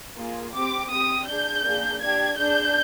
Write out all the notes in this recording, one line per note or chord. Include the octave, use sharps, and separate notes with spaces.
A#3 F4 G#4
C4 G4 D6
C4 G4 D#6
D4 G#4 G6
A#3 D4 G#4
D4 G4 G#6
D4 G#4 G6